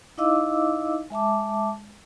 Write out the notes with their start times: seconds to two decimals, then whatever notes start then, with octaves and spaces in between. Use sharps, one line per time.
0.18 D#4 E4 D#5 F5 D6 E6
1.10 G#3 E5 A5 D6